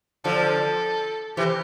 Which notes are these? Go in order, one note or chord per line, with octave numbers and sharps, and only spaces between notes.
D3 F3 A4
C3 E3 G4